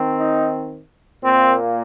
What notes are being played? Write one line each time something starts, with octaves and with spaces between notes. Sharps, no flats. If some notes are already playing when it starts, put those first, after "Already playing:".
Already playing: D#3 C4
D#4
A#2 A#3 C4